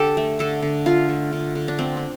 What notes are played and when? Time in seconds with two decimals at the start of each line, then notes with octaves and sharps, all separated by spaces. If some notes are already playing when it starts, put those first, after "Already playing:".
Already playing: D3 G4 A4
0.17 A3
0.39 D3 A4
0.62 D3
0.86 A3 F4
1.09 A3
1.33 D3
1.55 D3
1.68 D4
1.78 A3 C4
1.97 C4